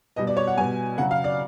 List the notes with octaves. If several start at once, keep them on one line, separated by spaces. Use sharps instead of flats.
B2 G3 D#5
D5
C#5
F#5
B2 G3 G#5
C#3 F#3 F#5
F5
D5